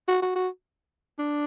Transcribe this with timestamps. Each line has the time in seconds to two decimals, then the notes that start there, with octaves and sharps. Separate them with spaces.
0.09 F#4
0.22 F#4
0.36 F#4
1.19 D4